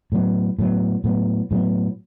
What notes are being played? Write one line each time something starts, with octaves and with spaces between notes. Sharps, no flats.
A2 F#3 B3
A2 F#3 B3
A2 F#3 B3
A2 F#3 B3